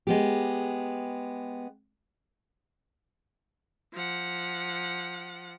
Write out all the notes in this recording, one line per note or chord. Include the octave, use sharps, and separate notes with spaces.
G#3 B3 G4
F3 F#5